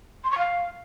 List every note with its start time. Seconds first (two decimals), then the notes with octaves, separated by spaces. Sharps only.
0.24 C6
0.31 C#6
0.38 F5